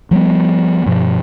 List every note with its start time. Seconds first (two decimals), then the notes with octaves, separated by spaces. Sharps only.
0.11 F3 G3 A3 B3
0.86 G2 B2 F3